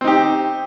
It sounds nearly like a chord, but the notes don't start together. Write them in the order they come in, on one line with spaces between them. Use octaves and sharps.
C4 D#4 G4